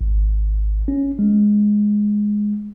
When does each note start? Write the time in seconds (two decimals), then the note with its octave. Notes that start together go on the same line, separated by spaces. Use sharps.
0.01 G#1
0.88 C#4
1.19 G#3